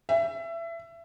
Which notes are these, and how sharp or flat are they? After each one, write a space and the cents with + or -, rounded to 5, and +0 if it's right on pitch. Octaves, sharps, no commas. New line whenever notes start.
E5 +25